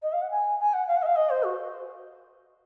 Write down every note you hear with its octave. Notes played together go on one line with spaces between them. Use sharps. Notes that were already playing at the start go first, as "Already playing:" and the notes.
D#5
F5
F#5
G#5
G#5
F#5
F5
F#5
D#5
F5
D#5
C5
F#4